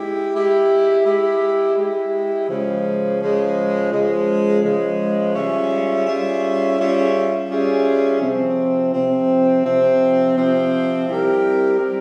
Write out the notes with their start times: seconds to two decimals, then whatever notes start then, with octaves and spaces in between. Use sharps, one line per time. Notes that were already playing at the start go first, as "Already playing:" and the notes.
Already playing: G#3 E4 G4
0.34 G#3 E4 G4
1.06 G#3 E4 G4
1.77 G#3 E4 G4
2.49 C#3 F3 G#3
3.21 C#3 F3 G#3
3.92 C#3 F3 G#3
4.64 C#3 F3 G#3
5.35 G3 C#4 F4 G#4 E5
6.06 G3 C#4 F4 G#4 E5
6.78 G3 C#4 F4 G#4 E5
7.49 G3 C#4 F4 G#4 E5
8.21 C3 F3 C4
8.93 C3 F3 C4
9.64 C3 F3 C4
10.36 C3 F3 C4
11.08 G3 C4 E4 G4 A#4
11.79 G3 C4 E4 G4 A#4